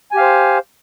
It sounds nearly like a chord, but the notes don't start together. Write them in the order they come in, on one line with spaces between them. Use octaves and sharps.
G#5 G4 F5 C5